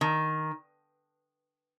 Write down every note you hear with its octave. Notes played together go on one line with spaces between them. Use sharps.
D#3